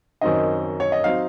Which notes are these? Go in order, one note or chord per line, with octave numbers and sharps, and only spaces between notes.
F#2 D#3 F#3 C4 D#4 D#5
C#5
D#5
F#3 C4 D#4 F5